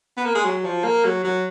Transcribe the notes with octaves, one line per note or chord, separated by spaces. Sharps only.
B3
A#3
G#3
F#3
F3
A#3
F#3
F#3